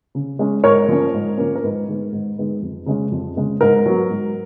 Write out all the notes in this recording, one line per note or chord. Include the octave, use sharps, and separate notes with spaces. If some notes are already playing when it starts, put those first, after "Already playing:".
C#3
G#3 C#4
G#2 A#4 C#5
F3 A#3 C#4
G#2
F3 A#3 C#4
A#4
G#2 B4
D#3 G#3 B3
G#2
D#3 G#3 B3
F2
C#3 G#3 C#4
F2
C#3 G#3 C#4
G#2 A#4
F#3 B3
G#2